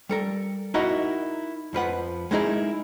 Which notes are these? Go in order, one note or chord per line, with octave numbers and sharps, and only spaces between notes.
G3 A4 A#4
D#4 E4 F#4 A#4 D#5 F#5
F2 F3 B4 F#5
G#3 B3 D#4 E4 G#4 A#4